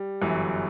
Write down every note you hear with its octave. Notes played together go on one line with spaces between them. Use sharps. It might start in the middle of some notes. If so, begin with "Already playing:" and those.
Already playing: G3
G1 F#2 E3